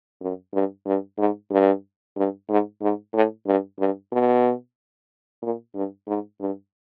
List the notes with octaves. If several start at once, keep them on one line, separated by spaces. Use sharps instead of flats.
F#2
G2
G2
G#2
G2
G2
G#2
G#2
A2
G2
G2
B2
A#2
G2
G#2
G2